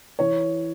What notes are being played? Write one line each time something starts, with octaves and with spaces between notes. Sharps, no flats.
E3 C#5